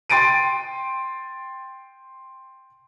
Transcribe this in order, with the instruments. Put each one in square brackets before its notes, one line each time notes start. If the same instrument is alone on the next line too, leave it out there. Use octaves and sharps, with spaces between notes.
[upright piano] G5 C6 A6 D7 D#7